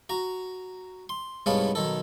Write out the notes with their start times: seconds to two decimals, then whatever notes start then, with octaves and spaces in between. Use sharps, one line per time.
0.10 F#4 A#5
1.09 C6
1.46 C2 G#2 B3 C#4 F5 A5
1.75 B1 D#3 A4